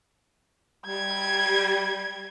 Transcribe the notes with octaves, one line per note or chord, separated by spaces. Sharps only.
G3 G#6